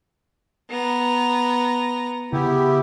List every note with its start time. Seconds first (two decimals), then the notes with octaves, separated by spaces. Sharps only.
0.70 B3 A#5
2.33 C#3 B3 E4 G4